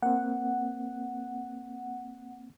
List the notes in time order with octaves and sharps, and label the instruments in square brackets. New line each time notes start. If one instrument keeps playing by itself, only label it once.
[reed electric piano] A#3 C4 [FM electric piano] F#5